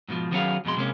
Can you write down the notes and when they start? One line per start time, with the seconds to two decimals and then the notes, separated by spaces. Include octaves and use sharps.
0.08 G#2 B2 D#3 F3
0.31 D#3 F#3 B3 C#4 G#4 F5
0.65 F2 B2 G#3 C6
0.77 C3 G#3 A#3 C#4